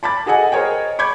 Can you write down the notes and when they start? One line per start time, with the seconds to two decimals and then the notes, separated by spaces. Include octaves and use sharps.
0.03 A5 B5 D6 A6
0.26 F#4 G#4 A4 D#5 F#5 G#5
0.52 G#4 A#4 C5 C#5 D#5 G5
0.99 B5 C#6 D6 G6 G#6